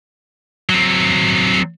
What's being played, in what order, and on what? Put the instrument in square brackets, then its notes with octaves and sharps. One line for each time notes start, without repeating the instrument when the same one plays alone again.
[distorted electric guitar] F#3 C4